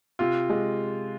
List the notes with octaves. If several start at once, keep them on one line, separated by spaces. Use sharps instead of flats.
C3 F4
G#3